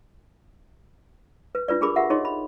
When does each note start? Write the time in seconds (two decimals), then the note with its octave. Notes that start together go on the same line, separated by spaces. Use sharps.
1.55 B4
1.68 D4 F4 B4 D5
1.81 D4 G4 G#4 A#4 B5 D6
1.96 F4 G4 A#4 E5 F#5
2.10 D#4 G#4 C#5 D#5 C6
2.25 B5